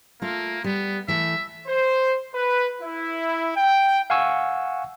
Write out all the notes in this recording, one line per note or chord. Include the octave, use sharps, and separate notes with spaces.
A3 A#3 F4
G3 B3
E3 A3 E5
C5
B4
E4
G5
F5 F#5 G#5 C#6 E6